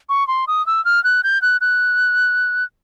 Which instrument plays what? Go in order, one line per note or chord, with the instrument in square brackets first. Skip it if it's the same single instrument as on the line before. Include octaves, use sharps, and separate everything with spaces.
[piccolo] C#6
C6
D#6
E6
F6
F#6
G6
F#6
F#6